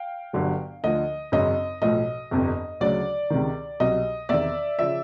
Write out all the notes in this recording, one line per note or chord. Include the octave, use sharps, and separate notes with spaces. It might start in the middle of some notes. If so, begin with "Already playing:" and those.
Already playing: F5 G5
G1 G2 D3 F#3
D2 D3 F3 D#5
G#1 F#2 C#3 D#5
B1 A2 F3 D#5
G1 F2 C3
D2 C#3 F#3 D5
C#2 C3 D#3
C2 B2 F#3 D#5
E2 C3 D#3 D5 E5
C#3 F3 D5 E5